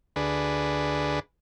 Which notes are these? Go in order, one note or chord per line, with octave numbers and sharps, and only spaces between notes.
D2 D4 G#4 B4